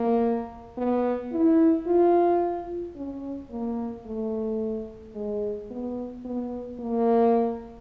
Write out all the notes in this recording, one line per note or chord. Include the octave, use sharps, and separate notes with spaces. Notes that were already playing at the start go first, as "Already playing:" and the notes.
Already playing: A#3
B3
E4
F4
C#4
A#3
A3
G#3
B3
B3
A#3